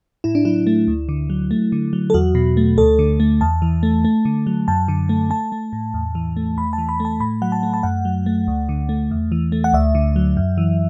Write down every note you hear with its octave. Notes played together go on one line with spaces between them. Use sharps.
A2 E4
D4
F#3 E4
A3
D2
D3
F#3
A3
D3
F#3
A4
E2 F#4
B2
A3
D2 A4
D3
A3
E2 A5
E3
A3
A3
D3
F#3
F#2 A5
D3
A3
A3 A5
A3
A2
E2
E3
A3
E2 B5
A5
E3
B5
A3
A5
A2 B5
F#3 F#5
A5
A3
A5
F#2 F#5
F#3
A3
D2
D3
A3
E2
E3
A3
F#5
D2 E5
D3
F#3
F#2
E3